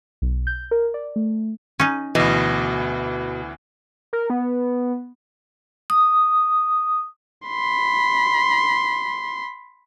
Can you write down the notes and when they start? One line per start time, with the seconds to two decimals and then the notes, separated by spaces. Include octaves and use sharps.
0.22 B1
0.47 G6
0.71 A#4
0.94 D5
1.16 A3
1.80 C#4 D#4
2.15 D2 B2 E3
4.13 A#4
4.30 B3
5.90 D#6
7.47 B5 C6